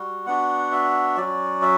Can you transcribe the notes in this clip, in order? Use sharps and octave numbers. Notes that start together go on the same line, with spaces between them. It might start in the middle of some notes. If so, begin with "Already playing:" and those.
Already playing: G3 F#4
B3 D4 F#4 F#5
E5
F#3 C#4 F#4 D5
E5